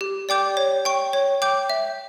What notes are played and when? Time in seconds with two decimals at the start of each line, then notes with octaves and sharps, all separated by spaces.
0.01 G4
0.29 D5 G5 D6 G6
0.57 C#5
0.85 G5 C#6
1.13 C#5
1.42 G5 D6 G6
1.69 E5